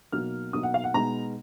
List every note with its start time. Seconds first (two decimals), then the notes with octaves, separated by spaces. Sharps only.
0.12 B2 F#3 A#3 D#4 F6
0.53 B2 F#3 A#3 D#4 D#6
0.63 F#5
0.74 F5
0.84 F#5
0.94 B2 G#3 B3 D#4 A#5